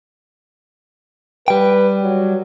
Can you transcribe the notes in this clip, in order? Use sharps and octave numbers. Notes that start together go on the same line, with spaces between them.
G3 B4 G5
F#3